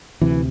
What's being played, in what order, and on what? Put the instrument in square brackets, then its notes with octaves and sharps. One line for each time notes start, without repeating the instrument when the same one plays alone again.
[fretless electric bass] D2 C3 E3